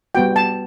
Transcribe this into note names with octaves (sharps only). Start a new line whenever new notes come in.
G3 B3 F#4 G5
A5